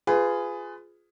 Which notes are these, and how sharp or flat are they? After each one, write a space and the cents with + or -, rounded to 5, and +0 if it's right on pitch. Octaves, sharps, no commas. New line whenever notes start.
F4 +0 G#4 +0 B4 +25